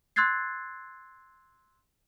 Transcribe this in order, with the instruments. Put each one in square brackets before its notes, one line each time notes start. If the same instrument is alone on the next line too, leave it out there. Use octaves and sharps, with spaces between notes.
[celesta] C6 E6 F#6 G#6 A6 C7